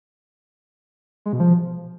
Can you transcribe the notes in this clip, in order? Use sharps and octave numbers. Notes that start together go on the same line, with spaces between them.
G#3
B2
F3